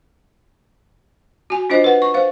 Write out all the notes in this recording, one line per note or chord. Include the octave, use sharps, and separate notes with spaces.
F#4 G#5
D4 F4 C5 D#5
B4 F#5
C#6
C5 F5